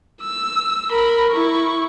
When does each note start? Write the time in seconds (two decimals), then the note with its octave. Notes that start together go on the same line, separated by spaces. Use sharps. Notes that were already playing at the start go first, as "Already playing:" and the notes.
0.21 E6
0.91 A#4 B5
1.31 E4 C#6